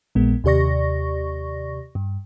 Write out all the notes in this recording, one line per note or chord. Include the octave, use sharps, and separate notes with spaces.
A#1 A#2 G#3 B3
D#2 C3 G4 D5 C#6 A#6
G2